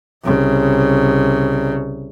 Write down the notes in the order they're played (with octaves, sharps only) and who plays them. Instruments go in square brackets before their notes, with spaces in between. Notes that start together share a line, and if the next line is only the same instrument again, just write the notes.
[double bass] C2 C#3